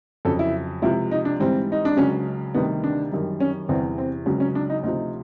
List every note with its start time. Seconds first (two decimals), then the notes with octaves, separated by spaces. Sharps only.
0.25 F2 C#3 F#3 A4
0.39 E4
0.82 C#2 C3 F3 E4
1.11 D#4
1.25 D4
1.40 G#2 E3 G3 C4
1.72 D#4
1.85 D4
1.97 C#2 C#3 F#3 C#4
2.54 D2 C3 D#3 G3 B3
2.84 D4
3.12 F#2 D#3 G3
3.40 C#4
3.69 E2 C3 E3 G3 C4
3.98 C4
4.26 C#2 C#3 F#3
4.40 C#4
4.55 D4
4.70 D#4
4.83 D2 C3 F3 D#4